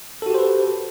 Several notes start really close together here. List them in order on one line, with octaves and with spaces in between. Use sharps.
A4 F#4 G4 C5 B4